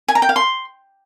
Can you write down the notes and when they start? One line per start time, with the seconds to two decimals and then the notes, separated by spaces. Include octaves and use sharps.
0.08 G#5
0.15 A#5
0.22 G5
0.29 F5
0.36 C6